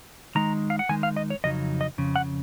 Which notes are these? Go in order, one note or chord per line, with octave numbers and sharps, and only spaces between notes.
D#3 G#3 D#4 A#5
F5
F#5
D#3 G#3 D#4 G#5
F5
D#5
C#5
F2 C#3 F#3 D#4 D#5
D#5
F2 C#3
F#5